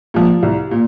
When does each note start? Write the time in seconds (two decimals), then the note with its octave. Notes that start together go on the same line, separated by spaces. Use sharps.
0.14 A#2 F3
0.43 C2
0.71 A#2